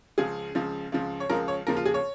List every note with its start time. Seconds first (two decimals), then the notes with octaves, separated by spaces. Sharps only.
0.18 C#2 C#3 F3 G#4
0.55 C#2 C#3 F3
0.92 C#2 C#3 F3
1.20 C#5
1.30 C#2 C#3 F3 A#4
1.48 C#5
1.67 D#2 C#3 F3 A#4
1.76 F4
1.86 G#4
1.94 C#5